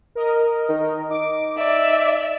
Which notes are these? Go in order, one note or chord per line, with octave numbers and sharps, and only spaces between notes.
A#4 D#5
D#3
D#4 D6 D7
D5 E5